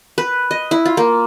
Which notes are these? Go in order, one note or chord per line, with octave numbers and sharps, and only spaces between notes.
B4
D#5
E4
F4
A#3